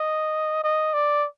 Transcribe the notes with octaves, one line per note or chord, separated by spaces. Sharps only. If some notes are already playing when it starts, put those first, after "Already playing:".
Already playing: D#5
D#5
D5